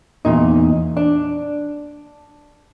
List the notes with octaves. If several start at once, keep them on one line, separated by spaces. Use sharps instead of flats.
E2 G2 A#2 D#4
D4